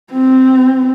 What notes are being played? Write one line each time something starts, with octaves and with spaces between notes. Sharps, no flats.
C4